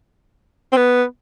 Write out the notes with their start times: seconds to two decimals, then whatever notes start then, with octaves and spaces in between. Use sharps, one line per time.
0.73 C4
0.77 B3